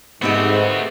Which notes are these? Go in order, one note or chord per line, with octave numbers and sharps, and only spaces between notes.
G#2 A3 B3 C4 F#4 G4